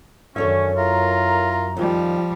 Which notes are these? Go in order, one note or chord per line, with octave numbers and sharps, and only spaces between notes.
F#2 D3 D#3 C#4 A4 C#5 E5
E4 F4 A#4 A#5
F2 D#3 F3 G3